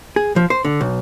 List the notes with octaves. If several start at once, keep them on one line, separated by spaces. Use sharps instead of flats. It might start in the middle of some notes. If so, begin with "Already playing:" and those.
G#4
F3
C5
D3
B1